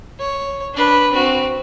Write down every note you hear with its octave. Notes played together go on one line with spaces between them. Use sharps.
C#5
D4 B4
C4 F#4